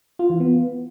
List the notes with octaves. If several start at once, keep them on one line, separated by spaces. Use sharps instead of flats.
F4
E3
B3